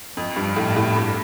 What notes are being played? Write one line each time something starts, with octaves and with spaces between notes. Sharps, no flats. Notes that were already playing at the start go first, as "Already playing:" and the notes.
F2
G2
A2
A2
G2